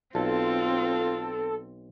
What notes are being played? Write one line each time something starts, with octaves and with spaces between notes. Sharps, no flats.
B1 C4 F4 A4